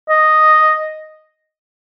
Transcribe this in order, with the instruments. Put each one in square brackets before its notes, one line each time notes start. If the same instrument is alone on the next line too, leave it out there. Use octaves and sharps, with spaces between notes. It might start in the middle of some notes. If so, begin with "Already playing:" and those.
[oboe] D#5